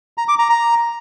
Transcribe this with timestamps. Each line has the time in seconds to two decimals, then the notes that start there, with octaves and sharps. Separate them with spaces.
0.18 A#5
0.28 D6
0.39 A#5
0.49 A#5